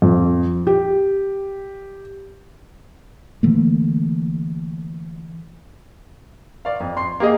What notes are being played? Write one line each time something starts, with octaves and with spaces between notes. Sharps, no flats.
F2
G4
D3 E3 A3 A#3
D5 F5
F2
C6 C7
A#3 G4 G#4 D#5